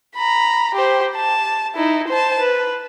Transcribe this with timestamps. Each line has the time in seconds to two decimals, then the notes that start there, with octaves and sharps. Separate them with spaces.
0.16 A#5 B5
0.74 G4 C5
1.16 A5
1.76 D#4 E4
2.08 C5 A5
2.40 B4